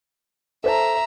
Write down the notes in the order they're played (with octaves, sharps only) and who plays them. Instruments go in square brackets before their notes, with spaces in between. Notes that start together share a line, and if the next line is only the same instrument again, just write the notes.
[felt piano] A4 C5 A5 [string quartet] E5 A#5